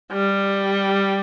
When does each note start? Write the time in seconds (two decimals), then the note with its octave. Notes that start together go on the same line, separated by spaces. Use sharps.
0.12 G3